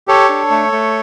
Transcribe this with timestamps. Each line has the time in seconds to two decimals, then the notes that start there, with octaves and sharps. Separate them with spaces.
0.08 G4 A4 C#5
0.29 D4
0.50 A3
0.72 A3